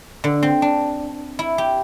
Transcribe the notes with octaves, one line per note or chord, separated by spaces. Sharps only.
D3
C4
D4
E4
G4